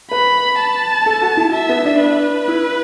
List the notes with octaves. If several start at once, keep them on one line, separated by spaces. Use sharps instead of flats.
B4 B5
A5
A4
F#4
E4
E5
B3
D4
B4
E4